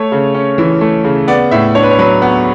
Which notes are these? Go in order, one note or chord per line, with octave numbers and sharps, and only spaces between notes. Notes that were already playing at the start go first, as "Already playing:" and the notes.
Already playing: A3 C#5
C#3
C#4
E3
A3
C#3
B3 D5
A2 E5
D4 C#5
B4
C#5
F#3 B4
B3